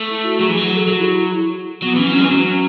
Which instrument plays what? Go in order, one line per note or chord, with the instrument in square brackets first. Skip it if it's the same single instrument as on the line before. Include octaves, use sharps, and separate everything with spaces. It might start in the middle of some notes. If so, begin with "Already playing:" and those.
Already playing: [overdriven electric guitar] A3
[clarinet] E4
F#4
[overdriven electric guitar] F#3 [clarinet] G#4
[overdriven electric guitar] E3
F#3
[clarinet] G#4
A4
[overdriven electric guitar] F#3 [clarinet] G#4
[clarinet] E4
F#4
E4
[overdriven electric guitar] F#3 [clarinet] B3
[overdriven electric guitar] E3 [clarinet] C#4
[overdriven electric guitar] F#3
[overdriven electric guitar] G#3 [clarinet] C#4
[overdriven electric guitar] E3
[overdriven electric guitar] F#3 [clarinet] C#4
[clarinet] C#4